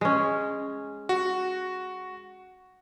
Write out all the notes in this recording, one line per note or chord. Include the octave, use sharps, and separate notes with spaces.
G#3 C#4
F#4